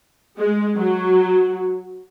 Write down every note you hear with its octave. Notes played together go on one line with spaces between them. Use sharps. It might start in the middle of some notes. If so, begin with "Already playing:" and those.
G#3
F#3